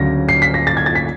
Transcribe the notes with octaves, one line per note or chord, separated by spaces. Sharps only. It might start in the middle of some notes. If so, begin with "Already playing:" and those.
Already playing: D2 C#3 F#3 A#6
C7
B6
A#6
A6
G#6
A6
B6